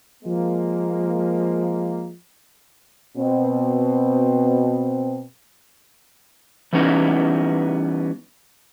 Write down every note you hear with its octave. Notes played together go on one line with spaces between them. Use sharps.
F3 G#3 A#3
B2 C4
E3 G3 B3 C#4 D#4 E4